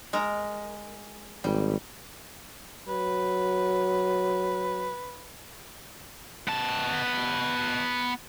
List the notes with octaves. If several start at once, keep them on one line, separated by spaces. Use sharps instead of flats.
G#3 A#4
G#1 G3
F#3 B4
B3 A5